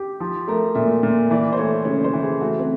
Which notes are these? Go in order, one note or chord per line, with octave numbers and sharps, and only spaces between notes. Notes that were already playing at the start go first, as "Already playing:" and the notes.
Already playing: G4
F3
A3 A#4
A#2 E5
A#2
E3 D5
C5
A3 C#5
C#3 C#5
C5
E3
G#4
A3 F#4
C4